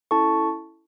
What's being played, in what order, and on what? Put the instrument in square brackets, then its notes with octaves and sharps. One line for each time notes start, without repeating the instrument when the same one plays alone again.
[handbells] C#4 E4 A4 A5 C#6